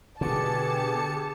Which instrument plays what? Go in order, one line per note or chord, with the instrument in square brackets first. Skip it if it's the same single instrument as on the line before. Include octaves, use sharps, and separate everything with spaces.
[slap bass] B2 [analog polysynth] D3 C#7 [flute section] G4 G#4 D6 [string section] A5